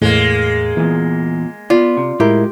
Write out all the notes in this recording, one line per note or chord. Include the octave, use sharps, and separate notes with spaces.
E2 A2 G#3 A#3
E2 A#2 E3
B3 F4 D5
C3
A2 G#3 E4 G4 A#4